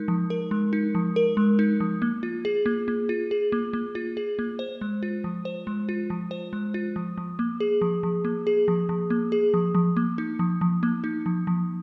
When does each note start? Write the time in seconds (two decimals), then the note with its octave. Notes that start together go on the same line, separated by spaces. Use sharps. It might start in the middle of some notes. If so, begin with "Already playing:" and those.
Already playing: G#3 D#4 A#4
0.08 F3
0.30 A#4
0.51 G#3
0.73 D#4
0.95 F3
1.16 A#4
1.37 G#3
1.59 D#4
1.80 F3
2.02 A#3
2.23 F4
2.45 G#4
2.66 A#3
2.88 A#3
3.09 F4
3.31 G#4
3.52 A#3
3.73 A#3
3.95 F4
4.17 G#4
4.39 A#3
4.59 C5
4.81 G#3
5.03 F4
5.24 F3
5.45 C5
5.67 G#3
5.89 F4
6.10 F3
6.31 C5
6.53 G#3
6.74 F4
6.96 F3
7.18 F3
7.39 A#3
7.60 G#4
7.81 F3
8.03 F3
8.25 A#3
8.47 G#4
8.68 F3
8.89 F3
9.10 A#3
9.32 G#4
9.54 F3
9.75 F3
9.97 A#3
10.18 D#4
10.39 F3
10.61 F3
10.83 A#3
11.04 D#4
11.26 F3
11.47 F3